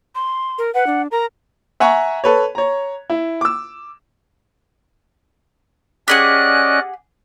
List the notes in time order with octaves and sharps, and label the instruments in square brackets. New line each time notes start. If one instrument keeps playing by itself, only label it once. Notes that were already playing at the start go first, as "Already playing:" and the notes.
[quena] C6
[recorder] A#4
[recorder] B4 [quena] F#5
[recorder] D4
[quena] A#4 [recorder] A#5
[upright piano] E5 F#5 G#5 A#5 C#6
A4 B4 C#5
C#5 A#5
E4
D6 E6
[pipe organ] C#4 D5 D#5 [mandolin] G4 G#4 F#5 [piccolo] F#6